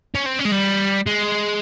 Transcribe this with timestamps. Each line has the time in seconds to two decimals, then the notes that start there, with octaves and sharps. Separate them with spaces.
0.15 C#4
0.26 C4
0.39 C#4
0.45 G#3
0.52 G3
1.06 G#3